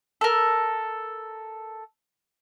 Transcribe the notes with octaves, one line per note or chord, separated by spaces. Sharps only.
A4 A#4